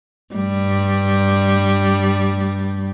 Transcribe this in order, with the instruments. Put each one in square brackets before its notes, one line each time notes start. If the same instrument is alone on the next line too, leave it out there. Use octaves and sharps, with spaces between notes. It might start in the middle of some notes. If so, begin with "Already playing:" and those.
[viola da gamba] G2 G3